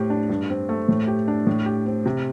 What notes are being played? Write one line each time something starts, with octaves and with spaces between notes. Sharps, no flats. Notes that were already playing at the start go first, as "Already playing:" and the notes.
Already playing: A2 C4 G4
D4
G2
C4
A3
A2
G4
D4
A2
G4
C4
C3